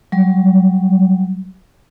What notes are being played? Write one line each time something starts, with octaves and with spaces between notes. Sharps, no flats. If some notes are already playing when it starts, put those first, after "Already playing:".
F#3 G3